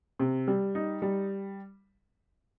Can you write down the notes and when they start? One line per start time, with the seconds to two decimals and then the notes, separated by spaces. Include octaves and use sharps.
0.19 C3
0.48 G3
0.75 D#4
1.02 G3